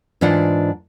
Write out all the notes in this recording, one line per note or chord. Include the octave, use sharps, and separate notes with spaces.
G#2 E3 D4 F4 D5 F#5